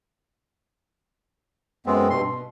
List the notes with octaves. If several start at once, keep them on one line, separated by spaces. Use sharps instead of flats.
F#2 G#3 B3 C4
G2 B2 C6
B2